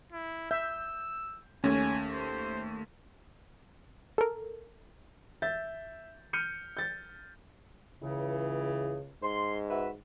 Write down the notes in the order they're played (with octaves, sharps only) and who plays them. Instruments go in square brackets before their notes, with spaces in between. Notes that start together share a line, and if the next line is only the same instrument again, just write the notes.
[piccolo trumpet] E4
[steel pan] E5 [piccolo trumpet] E6 [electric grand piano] G6
[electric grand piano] D#2 A3 [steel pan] C#4 [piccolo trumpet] G#5
[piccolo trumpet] C5
[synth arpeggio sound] A4 A#4
[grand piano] E5 G6 A6
F6 G6 C#7 D#7
G6 A6
[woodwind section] C#2 C#3 [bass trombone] E3
[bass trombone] G#2 [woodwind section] C6
[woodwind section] F#4 B4 E5